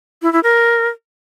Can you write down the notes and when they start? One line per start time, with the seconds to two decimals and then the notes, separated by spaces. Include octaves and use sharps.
0.22 E4
0.33 E4
0.43 A#4